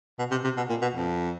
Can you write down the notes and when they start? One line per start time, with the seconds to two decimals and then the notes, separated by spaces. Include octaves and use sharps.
0.19 B2
0.31 C3
0.44 C3
0.57 B2
0.69 A#2
0.82 B2
0.95 F2